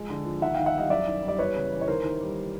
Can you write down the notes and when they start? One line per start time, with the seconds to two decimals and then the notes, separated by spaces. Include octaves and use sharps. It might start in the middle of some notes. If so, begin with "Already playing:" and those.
Already playing: F3 G#3
0.10 D3
0.25 F3
0.41 D#2 E5 F#5
0.54 D#3 F5 G5
0.66 E5 F#5
0.74 G3 D#5 F5
0.90 F#2 D5 E5
1.07 D#3
1.23 G3
1.28 D5
1.39 E2 B4 C#5
1.55 C#3
1.72 E3
1.81 C#5
1.87 D#2 A#4 C5
2.04 D#3
2.20 G3